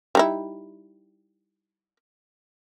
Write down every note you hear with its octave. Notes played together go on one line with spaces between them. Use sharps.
G3 D#4 E4